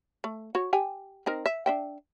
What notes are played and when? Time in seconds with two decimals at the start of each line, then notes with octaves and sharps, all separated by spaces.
0.24 A3
0.55 F#4 C#5
0.73 G4 G5 G#5
1.26 C4 D#4 A#4
1.46 E5
1.66 D4 E5 G5